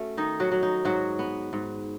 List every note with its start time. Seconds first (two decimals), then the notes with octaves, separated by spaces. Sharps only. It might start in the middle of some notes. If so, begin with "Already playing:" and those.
Already playing: A3 C#4 F#4
0.17 D#3 D#4
0.40 F#3 F#4
0.51 F#3
0.63 D#4
0.85 G#2 F#3 F#4
1.19 B3
1.53 G#2